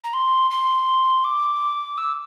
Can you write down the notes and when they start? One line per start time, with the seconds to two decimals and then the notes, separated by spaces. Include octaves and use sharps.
0.04 A#5
0.13 C6
0.50 C6
1.24 D6
1.97 E6